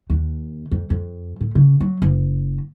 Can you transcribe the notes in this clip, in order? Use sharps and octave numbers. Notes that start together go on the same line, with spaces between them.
D#2
F2
F2
A2
C#3
F#3
F#1